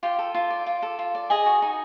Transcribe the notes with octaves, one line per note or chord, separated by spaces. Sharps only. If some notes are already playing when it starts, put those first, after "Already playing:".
F4 G4 G5
A4
F4
D5
F4
A4
F4
D5
G#4 D#5 G#5
F#4
D#4